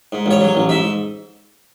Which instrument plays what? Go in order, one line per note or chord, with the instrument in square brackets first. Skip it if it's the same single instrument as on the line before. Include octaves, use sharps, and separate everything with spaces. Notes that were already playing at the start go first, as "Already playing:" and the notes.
[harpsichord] G#2
A1 C#5
F#3
A1
G#2 E5